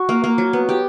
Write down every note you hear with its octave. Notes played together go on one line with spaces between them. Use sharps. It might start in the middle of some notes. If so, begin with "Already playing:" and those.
Already playing: F#4
A#3
A#3
F#3
B3
G4